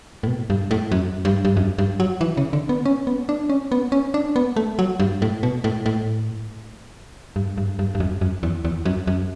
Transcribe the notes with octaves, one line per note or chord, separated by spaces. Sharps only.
A2
B2
G2
A2
F#2
G2
G2
F#2
G2
F#3
E3
C#3
D3
B3
C#4
B3
D4
C#4
B3
C#4
D4
B3
A3
F#3
G2
A2
B2
A2
A2
G2
G2
G2
G2
F#2
F#2
E2
E2
F#2
F#2